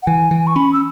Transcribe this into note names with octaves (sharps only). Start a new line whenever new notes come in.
F#5
E3 G#5
E3
C#6
C#4 B5
E6